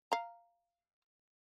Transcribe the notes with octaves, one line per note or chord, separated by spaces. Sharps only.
F5 A#5